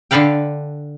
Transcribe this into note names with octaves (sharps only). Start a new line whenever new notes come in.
D3 D4 A4 B4 F5 G5